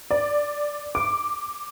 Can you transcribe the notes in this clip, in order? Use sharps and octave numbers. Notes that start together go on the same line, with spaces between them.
D5
D6